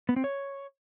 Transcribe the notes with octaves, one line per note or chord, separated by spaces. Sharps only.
B3
C4
C#5